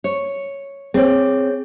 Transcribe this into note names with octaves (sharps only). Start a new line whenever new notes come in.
C#5
C4 G#4 C#5